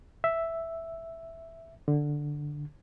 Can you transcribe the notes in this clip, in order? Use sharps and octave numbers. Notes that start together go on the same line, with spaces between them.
E5
D3